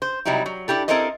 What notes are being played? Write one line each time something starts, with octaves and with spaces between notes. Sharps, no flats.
C5
C3 F#3 G3 D#4 E4
F#3
D4 E4 G4 A4
C4 E4 A4 A#4 C5 D#5